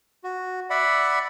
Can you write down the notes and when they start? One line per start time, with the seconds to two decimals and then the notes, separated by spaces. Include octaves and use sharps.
0.24 F#4
0.70 D5 E5 F#5 B5